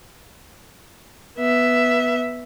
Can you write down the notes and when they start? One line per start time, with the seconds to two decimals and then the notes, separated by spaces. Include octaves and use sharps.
1.38 B3 E5